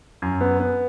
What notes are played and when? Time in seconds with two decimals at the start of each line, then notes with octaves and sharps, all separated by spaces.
0.22 F#2
0.41 B3
0.60 B3